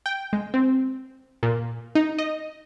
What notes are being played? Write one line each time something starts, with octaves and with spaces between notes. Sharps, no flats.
G5
G#3
C4
A#2
D#4
D#5